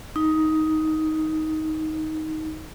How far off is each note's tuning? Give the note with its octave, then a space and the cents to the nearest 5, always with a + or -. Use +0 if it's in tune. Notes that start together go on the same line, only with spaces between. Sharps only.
D#4 +10